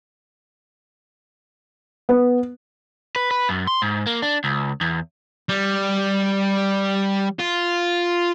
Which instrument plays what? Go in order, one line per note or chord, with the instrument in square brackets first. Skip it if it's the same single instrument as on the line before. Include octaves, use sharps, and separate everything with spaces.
[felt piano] B3
[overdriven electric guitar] B4
B4
F#2
C6
G#2
A#3
D4
C#2
E2
[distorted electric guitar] G3
F4